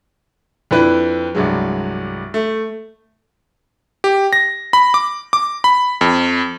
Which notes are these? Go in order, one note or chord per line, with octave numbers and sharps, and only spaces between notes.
F2 D4 E4 B4
C2 G2 F#3 G#3
A3
G4
A#6
B5
D6
D6
B5
F2